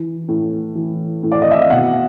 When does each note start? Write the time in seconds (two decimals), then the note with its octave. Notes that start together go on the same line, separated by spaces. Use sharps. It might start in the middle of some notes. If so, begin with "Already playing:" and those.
Already playing: E3
0.28 A2
0.75 E3
1.23 A2
1.32 D5
1.42 D#5
1.51 E5
1.61 F5
1.70 B2 F#5